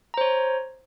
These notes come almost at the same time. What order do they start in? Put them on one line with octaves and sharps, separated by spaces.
A#5 C5 C#5